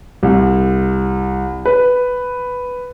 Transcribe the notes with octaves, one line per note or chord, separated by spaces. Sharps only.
C2
B4